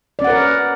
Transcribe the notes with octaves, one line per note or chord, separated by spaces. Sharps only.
C#4 A#4 B4 D5 F#5